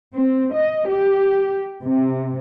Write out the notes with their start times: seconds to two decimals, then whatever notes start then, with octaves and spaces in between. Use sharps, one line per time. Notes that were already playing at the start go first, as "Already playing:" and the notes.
0.15 C4
0.54 D#5
0.88 G4
1.82 C3